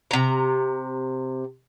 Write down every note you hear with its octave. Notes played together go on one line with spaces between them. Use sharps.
C3 A#5